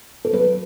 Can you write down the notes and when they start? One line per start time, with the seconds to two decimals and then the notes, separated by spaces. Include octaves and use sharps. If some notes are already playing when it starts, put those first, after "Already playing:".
0.25 A4
0.32 F#3 B4